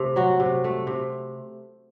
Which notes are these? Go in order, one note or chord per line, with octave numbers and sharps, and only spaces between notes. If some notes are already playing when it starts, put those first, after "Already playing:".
Already playing: C3 A3
F#3 F#4
C3
A3
C3